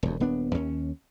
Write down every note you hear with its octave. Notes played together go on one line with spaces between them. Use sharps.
E1 D2
D#1 B3 D4
D#2 C#4